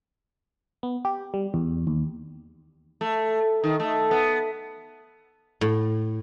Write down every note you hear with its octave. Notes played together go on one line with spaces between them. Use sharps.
B3
G4
G3
E2
D#2
A3
D#3
A3
B3
A2